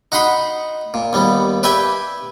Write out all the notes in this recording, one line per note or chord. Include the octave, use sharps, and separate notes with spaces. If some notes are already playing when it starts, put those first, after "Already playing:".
D#4 F#4 F#5 B5 C6 D#6
A#2
D#2 G3 B3
G4 B4 D5 E5 G5 G#5